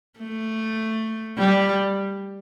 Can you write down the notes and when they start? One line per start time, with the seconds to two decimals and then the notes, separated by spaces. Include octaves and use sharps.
0.19 A3
1.38 G3